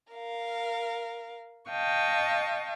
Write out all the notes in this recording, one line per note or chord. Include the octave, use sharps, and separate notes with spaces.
A#4 F5
D#5 F5 G5 A5 C#6